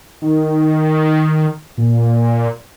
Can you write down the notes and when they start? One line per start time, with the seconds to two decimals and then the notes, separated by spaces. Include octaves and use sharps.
0.22 D#3
1.78 A#2